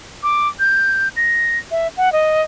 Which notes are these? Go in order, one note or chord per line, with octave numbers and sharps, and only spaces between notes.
D6
G6
A#6
E5
F#5
D#5